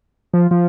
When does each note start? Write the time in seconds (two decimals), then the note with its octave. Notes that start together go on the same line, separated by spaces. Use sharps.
0.34 F3
0.51 F3